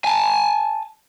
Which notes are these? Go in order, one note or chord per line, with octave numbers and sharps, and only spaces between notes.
G#5 A5